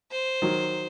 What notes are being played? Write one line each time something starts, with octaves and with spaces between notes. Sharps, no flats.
C5
D#3 F#3